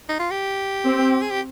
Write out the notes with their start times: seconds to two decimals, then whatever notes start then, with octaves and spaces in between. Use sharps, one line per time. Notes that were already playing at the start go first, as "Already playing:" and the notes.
0.09 D#4
0.19 F4
0.31 G4
0.85 C4
1.22 G#4
1.31 G4